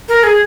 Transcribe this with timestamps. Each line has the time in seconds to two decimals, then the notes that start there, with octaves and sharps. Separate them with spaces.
0.09 A#4
0.23 G#4